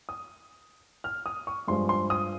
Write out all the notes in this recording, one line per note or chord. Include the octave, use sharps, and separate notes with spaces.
D#6
F6
D#6
C#6
G2 F3 G#3 C6
C6
D#6